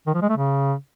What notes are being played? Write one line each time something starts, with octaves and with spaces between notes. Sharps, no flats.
D#3
F3
G#3
A3
C#3